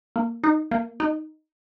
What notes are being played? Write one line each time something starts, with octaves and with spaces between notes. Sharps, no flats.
A#3
D#4
A#3
D#4